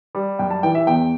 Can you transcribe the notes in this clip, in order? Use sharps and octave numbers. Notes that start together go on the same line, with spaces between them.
G3
F#2 G5
A5
E3 G5
E5
E2 G5